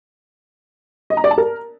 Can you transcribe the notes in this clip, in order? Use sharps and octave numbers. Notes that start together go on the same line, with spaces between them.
D#5
A#5
D5
A5
A#4